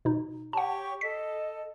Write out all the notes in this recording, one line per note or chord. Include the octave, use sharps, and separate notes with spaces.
B2 D#4
G4 C#5 F#5 A5 C#6
A4 D#5 B6